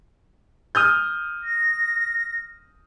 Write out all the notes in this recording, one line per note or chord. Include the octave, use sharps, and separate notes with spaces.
D#6 F6 G6
A#6